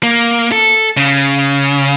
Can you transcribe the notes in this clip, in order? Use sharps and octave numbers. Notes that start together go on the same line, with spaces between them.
A#3
A4
C#3